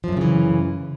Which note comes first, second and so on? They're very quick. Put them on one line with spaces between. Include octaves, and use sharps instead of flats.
F3 F#2 A#2 C#3 E3